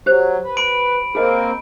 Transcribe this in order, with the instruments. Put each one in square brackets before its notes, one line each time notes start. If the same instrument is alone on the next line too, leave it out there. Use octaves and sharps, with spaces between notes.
[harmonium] F#3 [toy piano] G4 C5
[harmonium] B4
[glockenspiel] B5 D7
[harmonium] A#3 C4 A#4 [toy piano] G#4 D#5